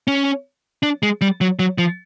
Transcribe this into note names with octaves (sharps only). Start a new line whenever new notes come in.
C#4
D4
G#3
G3
F#3
F#3
F3